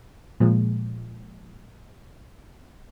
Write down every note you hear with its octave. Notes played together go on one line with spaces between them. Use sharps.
A#2 F3 G#3